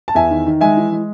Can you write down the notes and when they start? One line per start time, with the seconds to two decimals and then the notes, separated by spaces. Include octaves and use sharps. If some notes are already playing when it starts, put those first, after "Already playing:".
0.08 A5
0.15 E2 E5 G#5
0.31 D#3
0.47 D#3
0.61 G#3 E5 G#5
0.77 E3
0.92 G#3